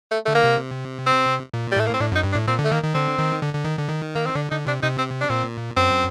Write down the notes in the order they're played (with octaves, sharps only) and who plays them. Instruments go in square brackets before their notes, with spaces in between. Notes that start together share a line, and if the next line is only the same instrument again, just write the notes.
[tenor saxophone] A3
[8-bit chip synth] D3 [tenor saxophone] A3
[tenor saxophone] A#3
[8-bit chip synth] C3
[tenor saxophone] C4
[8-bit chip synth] A#2
[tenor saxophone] G3
[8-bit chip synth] A2 [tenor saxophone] A3
[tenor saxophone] A#3
C4
[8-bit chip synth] A2 [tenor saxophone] D4
[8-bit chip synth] F#2 [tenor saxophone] D#4
[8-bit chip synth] G2
[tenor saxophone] D4
[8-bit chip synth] A2
[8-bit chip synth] A#2 [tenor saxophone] C4
[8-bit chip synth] D3
[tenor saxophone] A3
[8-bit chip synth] D#3 [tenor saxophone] A#3
[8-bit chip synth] D#3
[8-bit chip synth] D3 [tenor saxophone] C4
[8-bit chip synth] D#3
D3
D3
D#3
D3
D#3
[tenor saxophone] A#3
C4
[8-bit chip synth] D3 [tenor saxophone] D4
[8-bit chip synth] D3 [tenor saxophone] D#4
[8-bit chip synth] C3 [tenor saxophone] D4
[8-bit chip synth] C3 [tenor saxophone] D#4
[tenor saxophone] C4
D4
[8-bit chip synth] A#2 [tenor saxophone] C4
[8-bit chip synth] F#2 [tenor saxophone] C4